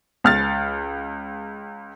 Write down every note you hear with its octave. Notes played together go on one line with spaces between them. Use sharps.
C#2 F6 A6